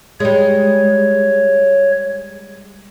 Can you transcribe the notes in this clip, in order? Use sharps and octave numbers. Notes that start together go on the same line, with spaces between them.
G3 G#3 C#5